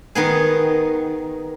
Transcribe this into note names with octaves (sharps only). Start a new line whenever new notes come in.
D#3 B3 G#4